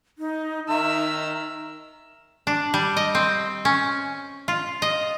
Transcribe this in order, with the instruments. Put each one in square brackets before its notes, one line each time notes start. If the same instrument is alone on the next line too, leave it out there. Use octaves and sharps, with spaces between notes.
[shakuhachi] D#4
[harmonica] D#3 A#5 [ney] D#4 [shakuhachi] E5 [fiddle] E6
[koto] D4
G3
D#5
C4
C#4
F4
D#5